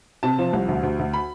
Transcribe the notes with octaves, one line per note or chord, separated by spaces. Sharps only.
C3 A5
F3
C2
D2
D2
D2
B5